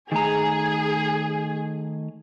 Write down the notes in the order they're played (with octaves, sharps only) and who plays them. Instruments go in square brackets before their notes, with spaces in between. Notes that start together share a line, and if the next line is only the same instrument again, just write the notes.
[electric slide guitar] D#3 A3 A#5 [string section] G#4